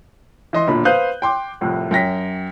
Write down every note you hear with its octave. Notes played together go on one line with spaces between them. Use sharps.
E3 D#5 C6
E1 A#2 D3 B5
B4 C5 F5 D#6 F#6 G6
G5 C6 D6
C2 F2 A2
F#2 G5 A#6 B6